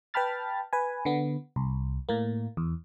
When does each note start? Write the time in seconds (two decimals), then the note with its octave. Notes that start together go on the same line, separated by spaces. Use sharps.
0.14 B4 G5 A5 B5 F6 A6
0.73 B4 G#5
1.05 D3 B3
1.56 C2
2.09 A2 A#3
2.57 E2